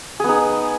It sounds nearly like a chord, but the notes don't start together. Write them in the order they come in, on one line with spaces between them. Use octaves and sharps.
G#4 B3 D#4